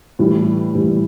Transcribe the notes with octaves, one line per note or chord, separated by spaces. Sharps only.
A2 E3 G3
A2 E3 G3